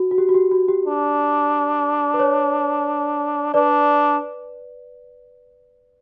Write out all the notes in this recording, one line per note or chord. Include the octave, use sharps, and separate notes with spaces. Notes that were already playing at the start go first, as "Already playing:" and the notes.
Already playing: F#4
F#4
G4
F#4
G4
F#4
G4
D4
B4
C#5
D4 B4 D5